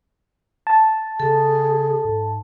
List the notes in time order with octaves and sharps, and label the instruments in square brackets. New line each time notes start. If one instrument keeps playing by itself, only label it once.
[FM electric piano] A5
[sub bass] C#3 [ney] G#4 [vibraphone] A4
[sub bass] G#2